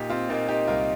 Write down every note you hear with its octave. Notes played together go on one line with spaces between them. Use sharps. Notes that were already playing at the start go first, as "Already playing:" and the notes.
Already playing: A#2 D#4 G4
C4 F4
A#2 A#3 D#4
D#4 G4
C2 F4 A#4